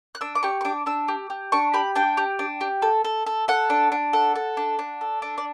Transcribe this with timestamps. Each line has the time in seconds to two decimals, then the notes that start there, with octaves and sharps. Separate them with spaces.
0.15 F#6
0.21 D4 E6
0.35 D6
0.43 G4 C#6
0.61 C#6
0.65 D4 D6
0.86 D4 E6
1.08 G4
1.30 G4
1.52 D4 C#6
1.74 G4 B5
1.96 D4 G5
2.17 G4
2.39 D4
2.61 G4
2.82 A4
3.05 A4
3.26 A4
3.48 A4 F#5
3.70 D4
3.92 D4
4.13 A4 F#5
4.36 A4
4.57 D4
4.79 D4
5.01 A4
5.22 D4
5.38 D5